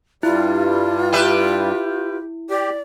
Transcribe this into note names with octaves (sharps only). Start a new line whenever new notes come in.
G2 G3 E4 F4
G4 B4 E5
G4 D5